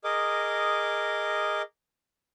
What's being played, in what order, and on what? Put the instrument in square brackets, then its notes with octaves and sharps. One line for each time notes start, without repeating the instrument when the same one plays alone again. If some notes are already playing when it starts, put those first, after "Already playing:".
[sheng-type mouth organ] G#4 A#4 D#5 D6